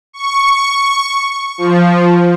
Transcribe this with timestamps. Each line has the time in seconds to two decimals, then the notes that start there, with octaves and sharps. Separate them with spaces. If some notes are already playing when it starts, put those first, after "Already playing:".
0.13 C#6
1.58 F3